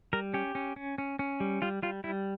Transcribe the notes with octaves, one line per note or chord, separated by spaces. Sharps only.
G3 A#4
C#4 G4
C#4
C#4
C#4
C#4
G3
G3 F4
G3 F4
G3 E4